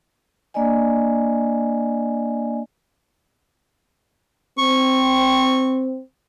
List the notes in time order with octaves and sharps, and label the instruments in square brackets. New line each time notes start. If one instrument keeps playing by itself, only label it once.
[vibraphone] A#3 D4 D5 D#5 G#5
[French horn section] C4 [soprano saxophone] C#6